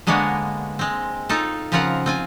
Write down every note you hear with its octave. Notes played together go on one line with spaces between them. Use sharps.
D3 G#3 A#3 B3 D4 C#5
G#3 C4
D#4 F4 A4
C#3 F3 C4 F4 A#4 F#5
C4 F4 G#5